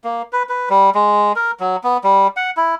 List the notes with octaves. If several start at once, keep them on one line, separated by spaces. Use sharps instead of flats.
A#3
B4
B4
G3
G#3
A#4
F#3
B3
G3
F#5
E4